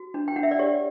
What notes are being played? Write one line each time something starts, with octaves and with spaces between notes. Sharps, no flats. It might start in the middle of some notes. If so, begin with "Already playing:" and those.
Already playing: F#4
D4
G5
D4 F#5
E5
D5
G4 C#5